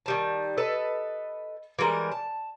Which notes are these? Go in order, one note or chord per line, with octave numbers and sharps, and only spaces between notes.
D#3 G3 A5
A4 B4 D#5
E3 G3 G#3 A#4
A5